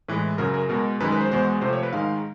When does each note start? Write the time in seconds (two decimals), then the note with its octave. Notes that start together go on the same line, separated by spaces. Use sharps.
0.08 A2 E3 G#3 B4
0.38 F#2 C#3 F#3 A#4
0.54 A#4
0.69 B2 G#3 A#4
1.00 F#2 D#3 G#3 B4
1.12 B4
1.21 C5
1.31 E2 B2 G#3 C5
1.61 C3 F3 A3 C5
1.73 C#5
1.83 B4
1.93 G#2 D#3 G#3 F5